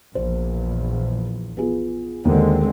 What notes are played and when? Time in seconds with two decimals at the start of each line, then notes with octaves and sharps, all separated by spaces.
0.15 A#1 E2 C5
1.57 B3 F4 G#4
2.25 D#2 D3 G#3 C4